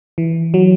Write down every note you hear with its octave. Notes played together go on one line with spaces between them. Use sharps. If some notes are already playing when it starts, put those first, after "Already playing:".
E3
F#3